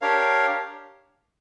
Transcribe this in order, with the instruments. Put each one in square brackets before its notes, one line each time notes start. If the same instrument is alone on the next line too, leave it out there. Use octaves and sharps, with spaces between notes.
[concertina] D4 G4 A#4 C#5 F5